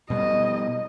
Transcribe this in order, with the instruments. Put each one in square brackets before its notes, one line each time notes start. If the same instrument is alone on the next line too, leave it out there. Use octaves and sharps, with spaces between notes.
[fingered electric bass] B2 G3 [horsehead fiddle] D#5